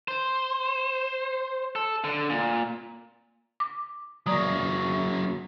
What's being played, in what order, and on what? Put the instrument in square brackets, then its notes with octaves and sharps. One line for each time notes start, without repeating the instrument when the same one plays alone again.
[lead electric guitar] C5
A4
D3
A#2
[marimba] D6
[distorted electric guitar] F#3 A#3 [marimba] D5 A#5 D#6